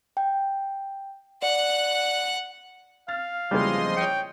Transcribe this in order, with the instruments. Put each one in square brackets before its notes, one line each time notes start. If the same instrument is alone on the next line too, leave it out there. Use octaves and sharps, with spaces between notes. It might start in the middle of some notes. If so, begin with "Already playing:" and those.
[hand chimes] G5
[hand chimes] D5 [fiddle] F#5 F#6
[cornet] F5 [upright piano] F6 A6
[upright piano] E2 A#2 C#3 [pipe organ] F3 D#5 C6 [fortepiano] G3 G#3
[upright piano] C#5 D#6 C#7 [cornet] G5